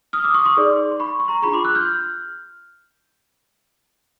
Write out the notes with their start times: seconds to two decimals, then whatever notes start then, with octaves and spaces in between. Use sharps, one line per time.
0.13 D#6 F6
0.24 D6 E6
0.34 C#6 D#6
0.45 C6 D6
0.57 D#4 G#4 B4 D5
0.91 C6
1.00 B5 C#6
1.20 C#6
1.28 A#5 C6
1.42 D4 F4 G#4 B5 C#6
1.53 C6 D6
1.65 E6 F#6
1.75 F6 G6